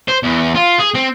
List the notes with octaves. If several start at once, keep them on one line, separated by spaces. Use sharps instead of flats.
C5
E2
F4
G#4
C4